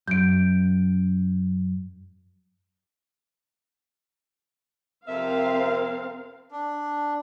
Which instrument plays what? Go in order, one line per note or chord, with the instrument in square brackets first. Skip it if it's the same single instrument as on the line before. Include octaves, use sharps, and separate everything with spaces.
[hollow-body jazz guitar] F#2 [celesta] G6 D7
[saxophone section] F2 C3 E5 [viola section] C4 A#4 F5
[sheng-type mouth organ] D4